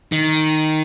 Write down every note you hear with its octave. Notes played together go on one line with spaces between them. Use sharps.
D#3